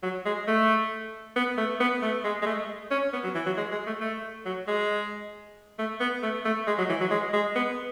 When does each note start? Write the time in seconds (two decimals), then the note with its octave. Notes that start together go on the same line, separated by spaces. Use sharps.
0.03 F#3
0.25 G#3
0.47 A3
1.36 B3
1.57 A3
1.80 B3
2.02 A3
2.24 G#3
2.42 G#3
2.46 A3
2.91 C#4
3.13 B3
3.24 F#3
3.35 E3
3.46 F#3
3.57 G#3
3.72 G#3
3.87 A3
4.01 A3
4.45 F#3
4.68 G#3
5.79 A3
6.00 B3
6.22 A3
6.45 A3
6.67 G#3
6.78 F#3
6.89 E3
7.00 F#3
7.11 G#3
7.33 G#3
7.55 B3